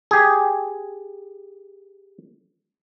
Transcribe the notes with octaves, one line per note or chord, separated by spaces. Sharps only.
G4 G#4